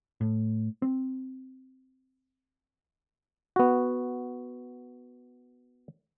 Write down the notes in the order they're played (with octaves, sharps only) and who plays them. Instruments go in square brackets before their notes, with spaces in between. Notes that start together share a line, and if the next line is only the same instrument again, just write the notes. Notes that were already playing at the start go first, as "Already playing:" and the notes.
[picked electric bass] A2
C4
[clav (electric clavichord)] B3 F#4